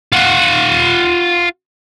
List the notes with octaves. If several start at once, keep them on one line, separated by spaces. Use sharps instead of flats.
F4 F#5